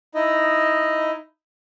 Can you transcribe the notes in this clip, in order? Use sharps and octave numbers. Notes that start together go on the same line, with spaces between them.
D#4 E4 D#5